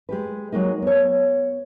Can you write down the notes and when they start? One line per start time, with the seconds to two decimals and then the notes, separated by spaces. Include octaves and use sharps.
0.09 G#3 G4 B4
0.52 F#3 G#3 A#3 D#4
0.82 B3 C#5